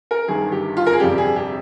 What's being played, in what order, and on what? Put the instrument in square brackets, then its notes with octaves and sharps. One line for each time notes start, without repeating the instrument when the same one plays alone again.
[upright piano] A#4
G1 G2 D#3 G#4
G4
F4
A#4
G#4
G1 F2 C3 G3 G4
G#4
G4